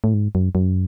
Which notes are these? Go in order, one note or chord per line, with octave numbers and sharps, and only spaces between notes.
A2
G#2
F#2
F#2